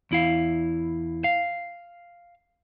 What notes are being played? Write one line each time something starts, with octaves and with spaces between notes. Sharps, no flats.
E2 E4 F5
F5